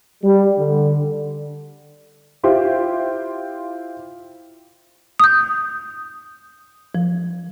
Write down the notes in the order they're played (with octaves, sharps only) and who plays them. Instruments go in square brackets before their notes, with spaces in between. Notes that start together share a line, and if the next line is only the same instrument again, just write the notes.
[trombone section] G3
D3
[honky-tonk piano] E4 F4 G4 C5
[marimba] D#6 G6
F3